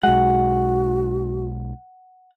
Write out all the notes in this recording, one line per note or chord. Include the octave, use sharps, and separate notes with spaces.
B1 G#3 F#4 F#5